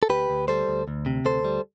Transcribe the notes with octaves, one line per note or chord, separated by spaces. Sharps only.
A4
D2 G4 B4
D2
G3 A4 C5
D2
D2
C3
D2 A4 C5
G3